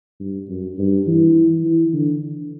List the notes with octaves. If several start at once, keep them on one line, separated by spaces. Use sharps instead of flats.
G2
F#2
G2
E3
E3
D3